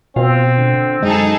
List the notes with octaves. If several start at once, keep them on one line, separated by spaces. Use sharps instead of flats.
B2 C4 F4
D3
F#2 G#3 D#4 G#4 A4